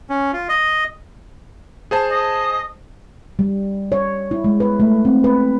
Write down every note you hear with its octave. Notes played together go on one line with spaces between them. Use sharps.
C#4
F4
D#5
G#4 C5 A5
D#5
G3
C#5
E4
G#3
B4
A3
C4
B4